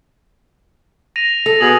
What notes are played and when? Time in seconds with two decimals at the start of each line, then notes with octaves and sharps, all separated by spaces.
1.16 A#6 D#7 F7
1.46 A4
1.61 B2 G#4 F#7